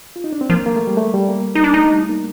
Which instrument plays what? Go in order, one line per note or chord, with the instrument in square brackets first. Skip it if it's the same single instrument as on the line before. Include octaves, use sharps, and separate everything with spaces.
[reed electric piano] F4
D#4
D4
C4
[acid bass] F3 [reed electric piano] A#3
[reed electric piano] A#3
A3
G3
A3
G3
A#3
[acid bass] D#4
D4
[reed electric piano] A3 [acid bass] D#4
[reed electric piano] G3
A#3